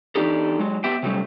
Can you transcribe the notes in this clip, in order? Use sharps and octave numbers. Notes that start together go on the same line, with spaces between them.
E2 E3 D4 D#4 G4 A4
F#3 G#3
B3 G4 E5 G5
C3 F#3 G3 A3 C#4